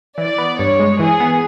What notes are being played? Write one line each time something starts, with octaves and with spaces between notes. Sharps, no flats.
E3 D5
B3
G2 C#5
G#3
E3 G#4
B3